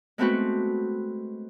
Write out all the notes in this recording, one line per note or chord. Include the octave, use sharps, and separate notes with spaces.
G#3 A3 B3 C4 F#4 B4